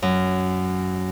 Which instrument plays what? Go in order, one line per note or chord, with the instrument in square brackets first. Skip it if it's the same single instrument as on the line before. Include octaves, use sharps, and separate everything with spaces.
[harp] F#2